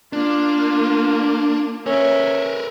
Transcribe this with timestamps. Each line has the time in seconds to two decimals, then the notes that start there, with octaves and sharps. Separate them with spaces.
0.13 A#3 D4 F4
1.87 C#4 A#4 B4 E5